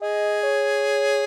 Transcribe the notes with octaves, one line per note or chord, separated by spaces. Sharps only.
G#4 D#5
C#5